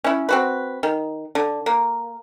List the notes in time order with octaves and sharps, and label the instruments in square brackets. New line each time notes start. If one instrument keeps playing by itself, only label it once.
[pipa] C#4 E4
C4 F#4 B4
D#3
D3
A#3